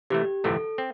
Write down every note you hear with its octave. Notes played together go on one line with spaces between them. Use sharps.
C3 E3 A3 G4
G1 F2 C3 E3 A3 A4
C4